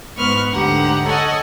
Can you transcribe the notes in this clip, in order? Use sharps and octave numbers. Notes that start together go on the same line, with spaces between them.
G#2 B3 B4 C#6 F6 F#6
D2 G#2 D3 G4 F#5 A#5
A4 C#5 D#5 F#5 G#5